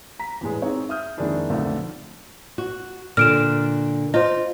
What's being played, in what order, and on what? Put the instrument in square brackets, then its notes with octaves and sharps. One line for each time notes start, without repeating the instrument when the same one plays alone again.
[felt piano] A#5 B6
E2 A2 G#3
C4 D#4 G#4 C#5
E5 D#6 F6 G6
F2 D#3 G#3 A#3 D4 E4
B1 F2 D3 A3
[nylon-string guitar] F#4
[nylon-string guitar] A#2 D3 [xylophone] F6 D7 E7
[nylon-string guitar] F4 [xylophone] C5 D#5